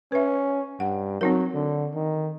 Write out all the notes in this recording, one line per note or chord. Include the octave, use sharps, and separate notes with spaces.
C#4 B4 E5
G2 F#5
F#3 C4 D#4 A#4
D3
D#3